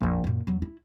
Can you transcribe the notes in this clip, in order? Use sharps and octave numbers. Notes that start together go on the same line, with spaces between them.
A#1 F2
F#2 A#2
E2 F#3
E4